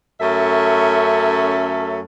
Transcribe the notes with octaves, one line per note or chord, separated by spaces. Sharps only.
F#2 A3 C#4 A4 E5